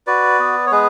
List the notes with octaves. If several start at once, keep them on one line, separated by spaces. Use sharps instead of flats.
F#4 B4 D5
B3
C#5
G#3 G#4 B4